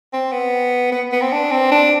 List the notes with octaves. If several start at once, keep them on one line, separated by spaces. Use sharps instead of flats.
C4
B3
B3
B3
C4
D4
C4
D4